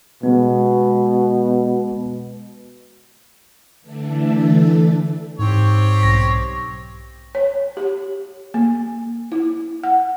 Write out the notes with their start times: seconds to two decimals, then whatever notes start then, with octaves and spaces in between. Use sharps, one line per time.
0.23 B2 G#3 B3
3.81 D3 E3 A3 D4 A4
5.39 G#2 C4 G4 C#5
6.03 B1 A#6
7.35 C#5
7.77 G4
8.54 A#3
9.32 E4
9.84 F#5